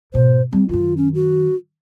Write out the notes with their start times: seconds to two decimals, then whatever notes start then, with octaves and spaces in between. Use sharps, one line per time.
0.14 G#2 B2 C5
0.53 G3 C4
0.69 F#2 D#3 F4
0.97 C#4
1.15 F#4